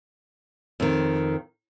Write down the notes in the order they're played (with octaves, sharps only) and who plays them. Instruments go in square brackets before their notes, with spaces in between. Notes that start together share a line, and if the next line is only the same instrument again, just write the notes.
[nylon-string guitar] F2 D#3